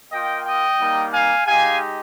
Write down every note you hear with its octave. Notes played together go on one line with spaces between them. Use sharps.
A#3 F4 D#5 G5
D#5 G5
G3 A#3 D#4
F5 G#5
G#3 D#4 G4 F5 G#5